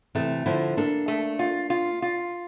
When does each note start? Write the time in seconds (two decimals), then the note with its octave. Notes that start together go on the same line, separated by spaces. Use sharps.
0.15 C3 E3 A3
0.46 D3 F3 E4
0.77 A#3 D4 A4
1.08 A3
1.39 F4
1.70 F4
2.02 F4